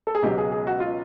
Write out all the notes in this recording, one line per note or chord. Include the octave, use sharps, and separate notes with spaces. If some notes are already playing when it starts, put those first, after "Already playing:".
A4
G#4
C#2 B2 F#3 G4
G#4
G#4
F#4
F4